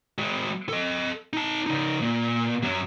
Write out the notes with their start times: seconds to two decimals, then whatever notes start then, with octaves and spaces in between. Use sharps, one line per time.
0.18 G#3 F#4
0.69 A4 D#5
1.33 D#4 A5
1.66 C#3 D#4
2.02 A#2
2.63 F#2 F#3